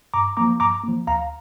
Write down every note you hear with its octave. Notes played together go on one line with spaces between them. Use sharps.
G2 A#5 D6
F3 A#3 A#5 D6
G2 A#5 D6
F3 A#3
D2 F5 A#5